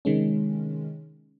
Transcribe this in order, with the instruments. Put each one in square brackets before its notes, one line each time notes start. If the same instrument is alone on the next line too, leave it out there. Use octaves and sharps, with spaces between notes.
[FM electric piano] C3 D#3 G#3 C#4